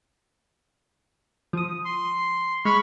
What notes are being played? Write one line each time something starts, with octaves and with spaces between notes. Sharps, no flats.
F3 D#6
C6
G#3 B5 C#6 F6